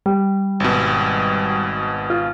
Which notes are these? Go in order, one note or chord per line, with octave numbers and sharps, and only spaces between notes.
G3
G#1 B2
F4